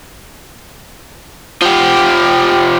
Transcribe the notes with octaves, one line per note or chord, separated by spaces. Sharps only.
F3 G4